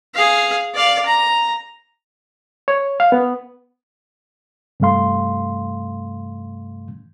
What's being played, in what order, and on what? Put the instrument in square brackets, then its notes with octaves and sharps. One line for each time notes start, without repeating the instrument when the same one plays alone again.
[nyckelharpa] G#4 F5
D5 F5
A#5
[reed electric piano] C#5
F5
B3
G2 C3 E3 A3 F5 C6